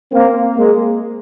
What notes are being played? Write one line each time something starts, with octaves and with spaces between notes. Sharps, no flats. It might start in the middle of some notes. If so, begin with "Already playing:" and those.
A#3 C4
G#3 A#3